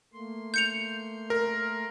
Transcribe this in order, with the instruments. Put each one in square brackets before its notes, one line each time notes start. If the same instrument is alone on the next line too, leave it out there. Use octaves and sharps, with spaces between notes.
[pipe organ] A3 A#3 C6
[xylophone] G6 C#7 F7
[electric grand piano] A#4